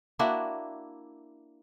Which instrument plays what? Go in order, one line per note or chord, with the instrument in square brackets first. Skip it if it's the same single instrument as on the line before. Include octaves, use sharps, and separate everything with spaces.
[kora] A#3 D4 E4 F#4